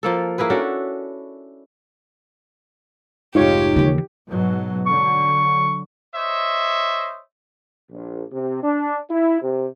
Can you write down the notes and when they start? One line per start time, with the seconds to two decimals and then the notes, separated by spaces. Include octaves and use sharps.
0.03 F3 A#3 A4
0.38 A#3 E4 G#4 B4
0.50 C#4 D4 F#4 A4
3.35 F1 G#2 D#4 F4 G4 C#5
3.76 D#2 C#3 E3
4.28 G#2 B2 F#3
4.86 D3 F#3 C#6
6.14 C5 C#5 D#5 E5
7.91 A#1
8.32 C3
8.63 D4
9.11 E4
9.42 C3